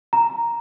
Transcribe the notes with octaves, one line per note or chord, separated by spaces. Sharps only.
A#5